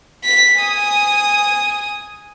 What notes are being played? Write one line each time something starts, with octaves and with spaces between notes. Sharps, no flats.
B6
G#5 D#6